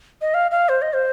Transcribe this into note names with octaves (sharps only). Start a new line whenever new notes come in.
D#5
F5
F5
C5
D#5
C5